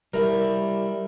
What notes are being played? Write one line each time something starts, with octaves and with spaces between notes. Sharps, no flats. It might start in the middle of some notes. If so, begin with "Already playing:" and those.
G3 E4 A#4